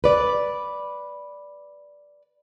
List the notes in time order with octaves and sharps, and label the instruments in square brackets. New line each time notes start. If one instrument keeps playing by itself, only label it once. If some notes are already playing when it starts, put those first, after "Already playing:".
[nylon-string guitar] B4 D5